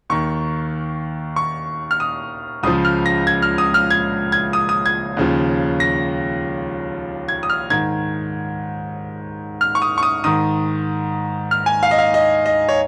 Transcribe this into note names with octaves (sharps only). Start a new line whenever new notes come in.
D#2 D#3 C#6
C#6
F6
D#6
C#2 C#3 F3 D#6
F6
A#6
G#6
F6
D#6
F6
G#6
G#6
D#6
D#6
G#6
D#2 C#3 F3
A#6
G#6
D#6
F6
G#2 D#3 G#6
F6
C#6
D#6
C#6
D#6
G#2 D#3 D#6
F6
G#5
F5
D#5
F5
D#5
D#5
C#5